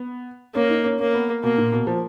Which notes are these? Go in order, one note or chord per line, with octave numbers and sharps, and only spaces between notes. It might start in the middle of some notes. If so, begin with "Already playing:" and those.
Already playing: B3
A#3 C#4
D#4
C#4
A#3 C#4
B3
B2 A#3
A#2
B2
F3